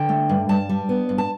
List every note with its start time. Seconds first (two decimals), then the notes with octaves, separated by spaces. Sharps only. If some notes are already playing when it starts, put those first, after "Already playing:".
Already playing: D3 G5
0.09 A3
0.29 G2
0.49 G2 A5
0.69 G3
0.89 B3
1.09 G2
1.18 A5